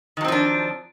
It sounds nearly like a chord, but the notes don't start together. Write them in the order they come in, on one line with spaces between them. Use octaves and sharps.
D#3 F#3 C4 F3 D4